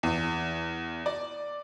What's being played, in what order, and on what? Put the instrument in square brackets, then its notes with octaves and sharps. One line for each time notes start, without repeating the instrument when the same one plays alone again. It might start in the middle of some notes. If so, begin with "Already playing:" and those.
[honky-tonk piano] E2
D5